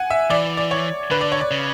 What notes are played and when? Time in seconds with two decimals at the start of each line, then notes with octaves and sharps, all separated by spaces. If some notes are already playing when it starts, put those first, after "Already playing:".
Already playing: F#5 G#5
0.10 E5
0.30 E3 D5
0.57 D5
0.71 C#5
1.11 D3 B4
1.21 D5
1.32 C#5
1.41 D5
1.51 C#3